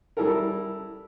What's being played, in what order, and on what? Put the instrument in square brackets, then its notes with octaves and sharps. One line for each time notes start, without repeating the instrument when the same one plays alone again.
[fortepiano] G3 E4 A4 A#4